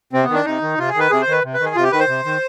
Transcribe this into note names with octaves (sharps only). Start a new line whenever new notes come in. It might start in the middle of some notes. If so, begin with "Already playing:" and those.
C3 C4
D#3 B3
D4
C3 D#4
D#3
C3 F4
G#4
D#3
B4
C3 G#4
C5
D#3 B4
C3
B4
D#3
G#4
C3 F4
G4
D#3 B4
C5
C3
D#3